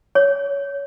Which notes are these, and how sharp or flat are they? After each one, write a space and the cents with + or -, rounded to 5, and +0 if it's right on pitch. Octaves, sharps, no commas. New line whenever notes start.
C#5 +20